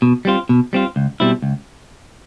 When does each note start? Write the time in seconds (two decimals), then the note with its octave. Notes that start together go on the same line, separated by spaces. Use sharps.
0.02 B2
0.25 G3 C4 F4
0.49 B2
0.73 G3 C4 F4
0.96 C#2
1.20 B2 G3 C4 E4
1.42 C#2